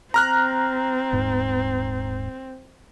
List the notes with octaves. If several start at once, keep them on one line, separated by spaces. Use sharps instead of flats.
C4 A#5 F6 F#6
D#1 G#2